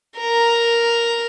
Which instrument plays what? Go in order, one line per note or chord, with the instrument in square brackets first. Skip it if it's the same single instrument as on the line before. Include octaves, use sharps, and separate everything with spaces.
[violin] A#4